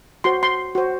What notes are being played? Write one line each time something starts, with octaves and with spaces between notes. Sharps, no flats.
F#4 C5 C6
C6
F#4 C5